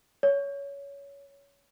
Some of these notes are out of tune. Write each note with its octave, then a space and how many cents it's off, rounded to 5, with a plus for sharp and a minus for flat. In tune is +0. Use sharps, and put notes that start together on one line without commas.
C#5 +20